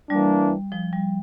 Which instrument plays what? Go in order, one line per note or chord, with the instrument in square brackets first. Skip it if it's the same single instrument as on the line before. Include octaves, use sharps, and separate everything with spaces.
[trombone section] E3 A#3 D4 [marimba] G3
[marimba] F3
G3